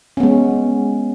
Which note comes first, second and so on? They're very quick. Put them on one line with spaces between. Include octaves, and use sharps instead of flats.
C#4 B3 G#3